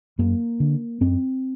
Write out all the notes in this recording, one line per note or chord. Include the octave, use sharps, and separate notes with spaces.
F#2 A#3
D3
F#2 C4